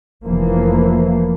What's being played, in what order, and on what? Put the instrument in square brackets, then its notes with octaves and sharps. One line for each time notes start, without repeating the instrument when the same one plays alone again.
[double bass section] F1 E3 F3 A#3